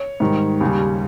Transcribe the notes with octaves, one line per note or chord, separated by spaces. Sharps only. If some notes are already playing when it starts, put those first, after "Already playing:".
Already playing: C#5
G#2 D#3 G3
D#2 C#3 G3